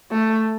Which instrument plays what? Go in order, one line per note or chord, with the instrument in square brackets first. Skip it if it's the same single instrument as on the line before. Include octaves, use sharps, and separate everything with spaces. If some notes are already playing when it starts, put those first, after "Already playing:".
[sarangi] A3